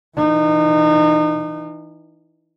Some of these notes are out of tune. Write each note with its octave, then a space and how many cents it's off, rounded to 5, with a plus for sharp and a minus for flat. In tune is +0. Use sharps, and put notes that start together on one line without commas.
E3 +0 D#4 -30